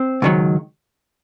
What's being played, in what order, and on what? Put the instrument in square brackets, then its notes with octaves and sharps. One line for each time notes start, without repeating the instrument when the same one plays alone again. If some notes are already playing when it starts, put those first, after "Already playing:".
Already playing: [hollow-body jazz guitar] C4
C#2 C3 D#3 F#3